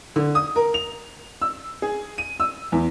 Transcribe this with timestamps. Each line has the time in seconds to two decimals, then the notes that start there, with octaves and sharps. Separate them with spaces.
0.16 D3
0.35 D#6
0.56 A#4
0.74 F7
1.42 E6
1.82 G#4
2.18 D#7
2.40 E6
2.72 E2